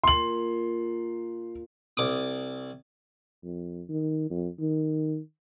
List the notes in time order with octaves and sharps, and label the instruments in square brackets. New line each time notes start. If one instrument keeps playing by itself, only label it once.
[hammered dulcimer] A#2 [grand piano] C6 F#7
[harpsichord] C2 D6 D#6
[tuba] F2
D#3
F2
D#3